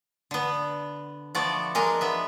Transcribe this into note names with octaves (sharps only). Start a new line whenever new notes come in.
D3 B3
F3 A3 B3 F#4 D5
G#3 D4 A#4
B3 E5